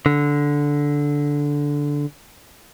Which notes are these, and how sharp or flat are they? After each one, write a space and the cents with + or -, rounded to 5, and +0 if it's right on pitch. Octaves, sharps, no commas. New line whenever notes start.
D3 -10